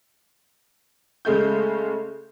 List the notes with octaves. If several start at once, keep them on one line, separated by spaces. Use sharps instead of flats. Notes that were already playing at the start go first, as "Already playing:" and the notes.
C#3 G#3 A3 G6